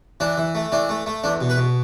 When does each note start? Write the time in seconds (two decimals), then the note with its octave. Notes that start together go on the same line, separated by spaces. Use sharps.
0.20 E3 D4
0.37 E3
0.55 A3
0.72 E3 D4
0.89 A3
1.06 A3
1.24 E2 D4
1.41 B2
1.50 B4
1.57 B2